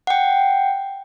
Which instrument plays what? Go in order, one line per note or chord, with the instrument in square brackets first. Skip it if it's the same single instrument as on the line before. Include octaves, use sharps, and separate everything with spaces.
[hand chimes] F#5 G5